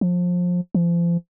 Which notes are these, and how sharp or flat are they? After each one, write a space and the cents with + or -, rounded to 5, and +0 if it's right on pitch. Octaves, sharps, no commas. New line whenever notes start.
F3 +25
F3 -35